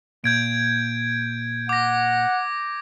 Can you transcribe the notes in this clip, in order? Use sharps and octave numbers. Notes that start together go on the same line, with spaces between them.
A#2 G6 G#6 D7
F#5 D6 A#6